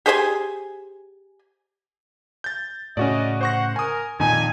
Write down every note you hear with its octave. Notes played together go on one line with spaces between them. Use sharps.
G4 G#4 C5 G#5
G6 A6
A2 C#3 C#4 F#4 D5 D#5
C5 F#5 C#6 A#6
A#4 G#5 D#6
F2 A#2 D#3 D#4 G#5